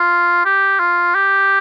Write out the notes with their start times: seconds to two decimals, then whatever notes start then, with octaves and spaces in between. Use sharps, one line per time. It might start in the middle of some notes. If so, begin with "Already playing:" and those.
Already playing: F4
0.45 G4
0.80 F4
1.15 G4